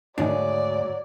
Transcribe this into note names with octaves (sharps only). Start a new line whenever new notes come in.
D2 G#2 D#3 F#3 D4 G#4 D5